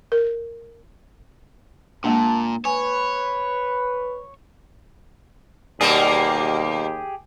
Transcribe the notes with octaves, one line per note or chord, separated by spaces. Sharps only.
A#4
A#2 G#3 A#3 D4 A5
B4 C#5 G#5
D#2 B2 G3 A#3 G4 G#4